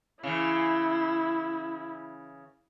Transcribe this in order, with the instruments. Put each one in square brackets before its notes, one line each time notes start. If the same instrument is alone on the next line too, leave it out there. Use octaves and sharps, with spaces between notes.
[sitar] C#3 E3 [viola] E4